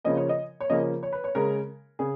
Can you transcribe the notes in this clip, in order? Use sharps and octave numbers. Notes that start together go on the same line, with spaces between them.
C#3 F3 A#3 C#4 D#5
C#5
D#5
C#5
C#3 F3 A#3 C#4 D#5
C#5
B4
C#5
C#3 G#3 C#4 A#4
C#3 G#4